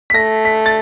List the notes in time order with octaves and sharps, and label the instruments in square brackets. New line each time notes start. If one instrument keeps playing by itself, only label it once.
[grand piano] B6
[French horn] A3 [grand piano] A#6
[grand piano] B6
A6